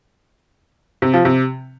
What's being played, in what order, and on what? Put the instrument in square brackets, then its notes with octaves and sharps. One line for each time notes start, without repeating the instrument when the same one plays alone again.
[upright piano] C3
F3
C3